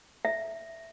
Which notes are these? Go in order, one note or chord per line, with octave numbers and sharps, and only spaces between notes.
E5